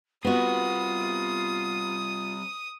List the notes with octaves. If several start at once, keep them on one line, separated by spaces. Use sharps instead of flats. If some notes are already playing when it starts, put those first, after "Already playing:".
G3 B3 C4 F4 F#4 D#6